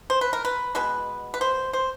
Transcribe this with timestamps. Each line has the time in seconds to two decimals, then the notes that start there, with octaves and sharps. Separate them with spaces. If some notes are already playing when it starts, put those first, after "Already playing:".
0.10 C5
0.21 B4
0.33 A#4
0.45 B4
0.75 B2 G#3 B3 B4
1.34 B4
1.41 C5
1.73 C5